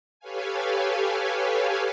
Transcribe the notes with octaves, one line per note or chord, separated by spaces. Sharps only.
G4 A4 B4 C#5 F5 G#5